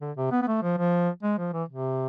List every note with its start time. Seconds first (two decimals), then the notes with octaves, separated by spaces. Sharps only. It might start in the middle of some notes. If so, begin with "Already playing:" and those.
0.01 D3
0.17 C3
0.32 B3
0.42 B3
0.47 A3
0.62 F3
0.78 F3
1.23 G#3
1.38 F3
1.53 E3
1.68 C3